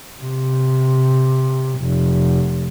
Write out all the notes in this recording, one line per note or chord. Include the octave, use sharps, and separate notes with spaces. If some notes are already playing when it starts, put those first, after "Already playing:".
C3
F1